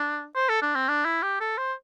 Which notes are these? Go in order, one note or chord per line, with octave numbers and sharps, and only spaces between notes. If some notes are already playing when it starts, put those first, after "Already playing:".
Already playing: D4
C5
A4
D4
C4
D4
E4
G4
A4
C5